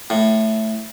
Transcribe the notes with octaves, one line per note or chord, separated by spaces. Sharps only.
A2